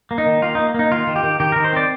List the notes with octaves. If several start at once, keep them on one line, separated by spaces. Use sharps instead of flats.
A#3
D#4
D#3
A#3 F4
A#3 D#4
A#3 D#4
D#3 F4
D#3
G4
D#3
D#3 G4
D#3 A#4
C5
C4 D5